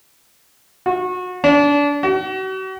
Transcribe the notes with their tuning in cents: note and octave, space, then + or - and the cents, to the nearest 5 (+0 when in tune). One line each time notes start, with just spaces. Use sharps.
F#4 -30
D4 -25
F#4 +40